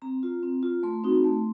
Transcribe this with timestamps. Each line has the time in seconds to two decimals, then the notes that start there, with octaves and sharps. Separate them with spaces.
0.02 C4 A#5
0.23 F4
0.43 C4
0.63 F4
0.83 A3 C6
1.04 C4 D#4 F#4
1.24 A3